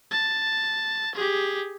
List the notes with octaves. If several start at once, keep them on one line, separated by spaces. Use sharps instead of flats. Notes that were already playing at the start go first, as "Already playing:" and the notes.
A5
G4 G#4